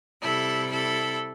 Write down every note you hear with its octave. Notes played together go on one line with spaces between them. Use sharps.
C3 G3 E4 A4
E4 A4